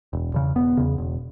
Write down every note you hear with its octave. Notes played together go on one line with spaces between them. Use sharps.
E1
E2 C#3
E1 B3
E2 C#3
E1